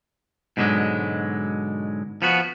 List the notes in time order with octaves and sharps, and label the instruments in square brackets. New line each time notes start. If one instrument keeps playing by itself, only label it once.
[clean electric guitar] G#2 B2 D3 F#3 G#3
F3 B3 F#4